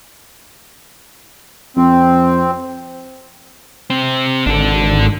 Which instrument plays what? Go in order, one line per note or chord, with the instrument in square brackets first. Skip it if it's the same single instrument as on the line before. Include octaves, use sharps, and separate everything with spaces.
[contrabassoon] F2 [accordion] C4
[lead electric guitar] C3 C4
[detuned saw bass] G#1 [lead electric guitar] D4 A4